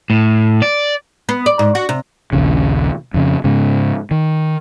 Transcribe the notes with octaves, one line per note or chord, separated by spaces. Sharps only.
A2
D5
B3
D5
G#2
F#4
C3
A#1 D#2 C#3
F2 C#3
G#2 C#3
D#3